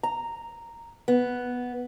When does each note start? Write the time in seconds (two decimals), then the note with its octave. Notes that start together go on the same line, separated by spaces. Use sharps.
0.03 A#5
1.08 B3